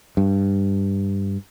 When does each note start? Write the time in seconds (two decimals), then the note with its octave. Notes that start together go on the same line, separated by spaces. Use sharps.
0.17 G2